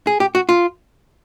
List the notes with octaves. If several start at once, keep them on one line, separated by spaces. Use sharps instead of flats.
G#4
G4
F#4
F4